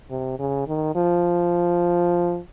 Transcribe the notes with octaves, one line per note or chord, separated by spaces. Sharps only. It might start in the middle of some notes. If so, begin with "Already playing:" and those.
C3
C#3
D#3
F3